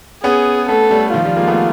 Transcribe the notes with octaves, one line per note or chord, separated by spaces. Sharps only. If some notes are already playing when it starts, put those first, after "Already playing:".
B3 C#4 G#4
A3 B3 A4
G3 A3
D#3 F3 F4
F3 G3
G#3 A#3
A3 B3